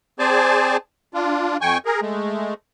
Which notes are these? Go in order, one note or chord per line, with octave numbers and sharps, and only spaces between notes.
C4 G#4 C5 D5 G#5 A5
D4 F4
F2 G5 G#5 C#6
G#4 A#4
G#3 A3